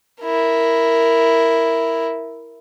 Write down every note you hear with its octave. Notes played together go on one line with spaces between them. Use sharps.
E4 A#4